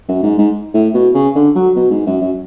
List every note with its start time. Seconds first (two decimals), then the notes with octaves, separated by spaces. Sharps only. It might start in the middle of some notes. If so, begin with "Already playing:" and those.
0.08 F#2
0.23 G#2
0.38 G#2
0.74 A2
0.94 B2
1.14 C#3
1.35 D3
1.55 F#3
1.76 B2
1.91 G#2
2.06 F#2
2.21 F#2